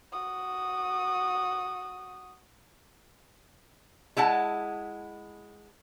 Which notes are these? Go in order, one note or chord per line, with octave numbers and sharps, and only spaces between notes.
F#4 D#6
G#3 E4 F#5 A5